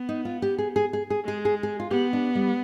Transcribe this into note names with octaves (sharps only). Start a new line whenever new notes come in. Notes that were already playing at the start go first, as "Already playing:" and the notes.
Already playing: B3
D#4
F4
G4
G#4
G#4
G#4
G#4
G#3 G#4
G#4
G#4
F4
B3 G4
D4
G3